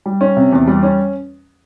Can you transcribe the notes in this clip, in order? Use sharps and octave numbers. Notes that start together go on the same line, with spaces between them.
G3
C#4
C3
E2
G3
C#4